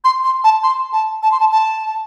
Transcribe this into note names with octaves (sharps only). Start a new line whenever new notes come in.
C6
C6
A5
C6
A5
A5
C6
A5
A5